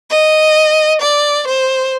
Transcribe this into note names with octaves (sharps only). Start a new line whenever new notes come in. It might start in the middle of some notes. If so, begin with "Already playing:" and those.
D#5
D5
C5